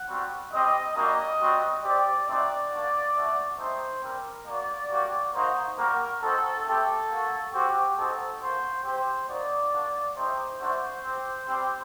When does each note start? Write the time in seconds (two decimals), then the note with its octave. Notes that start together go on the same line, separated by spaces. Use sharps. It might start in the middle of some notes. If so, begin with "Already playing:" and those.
Already playing: F#5
0.08 G3 C4 F#4
0.52 G3 C4 G4 D#5
0.95 G3 A#3 D4 F#4 D#5
1.40 G3 C4 F#4
1.83 C4 G4 D5
2.27 A3 C4 D#4 F#4 D5
2.72 A#3 D4 F#4
3.15 A3 D4 F#4
3.58 A3 D#4 G4 C5
4.03 G3 C4 G4 A#4
4.47 A#3 F#4 D5
4.90 G3 A#3 F#4
5.34 A#3 D#4 F#4 C5
5.78 G3 A#3 F#4 A#4
6.22 C4 D#4 F#4 A4
6.66 A3 C4 G4 A4
7.10 A#3 F#4
7.53 C4 F#4 G4
7.97 C4 D#4 F#4 A4
8.41 A#3 F#4 C5
8.84 C4 G4 C5
9.29 A#3 D#4 F#4 D5
9.72 A#3 D4 F#4
10.16 A3 D#4 G4 C5
10.60 A3 D4 F#4 C5
11.04 C4 G4
11.48 G3 C4 G4